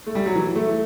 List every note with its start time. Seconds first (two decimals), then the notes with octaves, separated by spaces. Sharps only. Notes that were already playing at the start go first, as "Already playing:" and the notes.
0.07 A3
0.15 G3
0.26 F#3
0.35 E3
0.56 A3